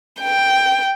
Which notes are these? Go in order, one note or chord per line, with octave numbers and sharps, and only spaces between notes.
G5